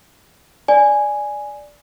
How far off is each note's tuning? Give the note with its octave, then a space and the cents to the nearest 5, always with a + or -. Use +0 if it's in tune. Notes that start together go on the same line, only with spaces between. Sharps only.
D5 +0 G#5 +0